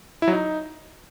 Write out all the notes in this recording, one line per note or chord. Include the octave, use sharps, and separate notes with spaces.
E4
F#3
D#4